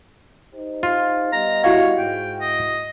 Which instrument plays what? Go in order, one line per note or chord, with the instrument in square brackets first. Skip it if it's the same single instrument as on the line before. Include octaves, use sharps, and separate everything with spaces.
[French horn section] D#4 G4 C5
[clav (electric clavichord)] F4
[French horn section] G3 B3 D#5 [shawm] A#5
[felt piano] E4 F#4 F5 [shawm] C#5
[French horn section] G#2 [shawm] G5
[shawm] D#5